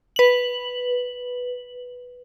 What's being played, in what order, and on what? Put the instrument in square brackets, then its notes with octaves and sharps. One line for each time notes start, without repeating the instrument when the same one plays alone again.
[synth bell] B4 F#7